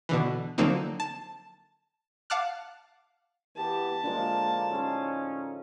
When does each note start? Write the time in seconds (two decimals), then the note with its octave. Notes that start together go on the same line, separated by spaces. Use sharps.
0.09 B2 D3 E3
0.58 D3 F3 F#3 A#3 C4 D#4
1.00 A5
2.30 F5 F#5 A5 D6 F6 F#6
3.56 E3 B3 G4 A5
4.04 D3 F3 G#3 A#3
4.71 A2 C#4 D#4 A4 C6